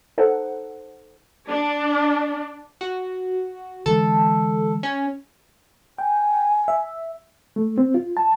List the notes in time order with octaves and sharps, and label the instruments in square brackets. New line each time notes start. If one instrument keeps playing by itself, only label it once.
[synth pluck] D#4 A4 C5 F#5
[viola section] D4
[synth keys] F#4
[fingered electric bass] D3 E3 G#3 [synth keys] A4
[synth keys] C#4
[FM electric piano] G5 [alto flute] G#5
[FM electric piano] E5
[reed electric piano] A3
C4
F4
A5